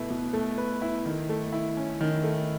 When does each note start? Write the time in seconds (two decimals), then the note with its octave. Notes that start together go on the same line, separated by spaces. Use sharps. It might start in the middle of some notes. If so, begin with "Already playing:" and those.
Already playing: B2 A3 E4 B4
0.10 B2
0.33 A3
0.58 B4
0.82 E4
1.06 D#3
1.29 A3
1.53 E4
1.77 C#4
2.01 D#3
2.24 A3